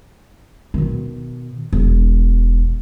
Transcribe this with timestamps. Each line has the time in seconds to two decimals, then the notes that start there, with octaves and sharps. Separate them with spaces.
0.74 B2 D#3
1.73 E1